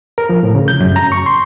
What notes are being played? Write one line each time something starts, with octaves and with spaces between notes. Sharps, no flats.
A#4
F3
A2
C#3
G6
F#2
A#5
C#6
C6